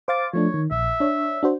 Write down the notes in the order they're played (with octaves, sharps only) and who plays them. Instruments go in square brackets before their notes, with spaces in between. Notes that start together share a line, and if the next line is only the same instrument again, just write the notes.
[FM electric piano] C5 F5 A6 [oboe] D6
[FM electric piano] F3 A3 D4 [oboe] C#5
[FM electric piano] D#3
[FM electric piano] A#1 [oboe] E5
[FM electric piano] D4 C#5
D4 F#4 C5